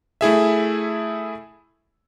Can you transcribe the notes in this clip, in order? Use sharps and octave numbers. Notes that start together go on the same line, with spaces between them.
A3 E4 G#4 E5